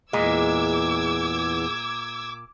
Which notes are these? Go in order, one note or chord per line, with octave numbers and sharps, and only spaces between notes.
E2 A#2 G#3 D6 E6 G#6